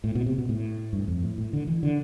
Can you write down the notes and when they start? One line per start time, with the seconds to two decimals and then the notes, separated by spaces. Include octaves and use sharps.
0.04 A2
0.15 B2
0.26 C3
0.38 B2
0.49 A2
0.93 G2
1.08 F2
1.23 A2
1.38 A2
1.53 D3
1.67 E3
1.83 D3